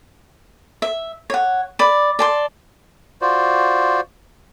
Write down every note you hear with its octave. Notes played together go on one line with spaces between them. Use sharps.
E5
C#5 F#5
D5 B5
D5 A5 C6
F4 F#4 C5 D5